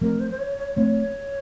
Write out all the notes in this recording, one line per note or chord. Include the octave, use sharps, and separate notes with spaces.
F3 A3 C4 A#4
C5
C5
C#5
C#5
F3 A3 C4 C#5